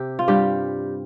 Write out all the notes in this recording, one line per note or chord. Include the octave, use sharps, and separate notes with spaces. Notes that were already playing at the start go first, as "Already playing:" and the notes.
Already playing: C3 G4
F4
G2 G3 G4